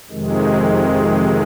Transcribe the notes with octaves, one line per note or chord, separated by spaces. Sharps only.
F2 C3 D#3 G#3